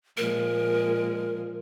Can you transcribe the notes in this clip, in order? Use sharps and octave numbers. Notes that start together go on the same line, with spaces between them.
A#2 F3 G#3 A#4